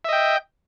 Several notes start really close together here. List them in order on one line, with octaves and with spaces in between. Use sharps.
E5 D#5 G5